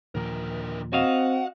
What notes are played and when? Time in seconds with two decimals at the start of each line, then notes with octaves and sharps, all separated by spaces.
0.15 D#2 A#2 D3 F3 A#4
0.93 C4 F#4 D#5 F5 F#5